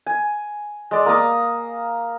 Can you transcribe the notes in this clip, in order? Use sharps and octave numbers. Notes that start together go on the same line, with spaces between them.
G#5
G#3 D5
A#3 F5 A#5 D#6